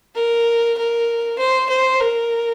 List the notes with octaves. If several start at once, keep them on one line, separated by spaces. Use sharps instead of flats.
A#4
A#4
C5
C5
A#4